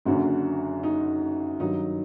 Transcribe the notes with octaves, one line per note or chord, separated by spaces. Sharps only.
F#1 F#2 D3 F#4
D#4
G2 D#3 F#3 D#4